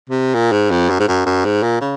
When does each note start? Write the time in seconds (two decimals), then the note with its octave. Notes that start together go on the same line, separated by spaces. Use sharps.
0.09 C3
0.34 A#2
0.52 G#2
0.71 F2
0.90 F#2
0.99 G#2
1.08 F#2
1.26 F#2
1.45 G#2
1.63 A#2
1.81 C#3